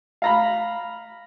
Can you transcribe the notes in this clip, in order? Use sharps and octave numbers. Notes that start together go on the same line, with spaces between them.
F5 A#5 B5